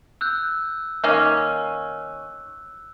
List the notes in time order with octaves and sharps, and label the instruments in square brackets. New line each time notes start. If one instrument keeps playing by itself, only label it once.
[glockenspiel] E6 F#6 G6
[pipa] D#3 A#3 C#4